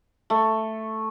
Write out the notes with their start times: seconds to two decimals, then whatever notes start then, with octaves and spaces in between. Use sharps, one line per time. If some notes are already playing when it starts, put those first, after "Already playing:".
0.30 A3